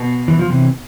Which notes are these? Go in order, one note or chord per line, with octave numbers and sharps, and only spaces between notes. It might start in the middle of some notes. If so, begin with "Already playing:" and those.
Already playing: B2
E3
F3
C3 E3